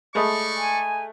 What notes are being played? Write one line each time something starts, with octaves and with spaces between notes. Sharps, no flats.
G#3 A3 D5 D#5 B5 C#6 D#6
G#5